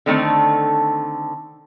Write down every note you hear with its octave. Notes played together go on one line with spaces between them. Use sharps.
D3 D#3 A3 C4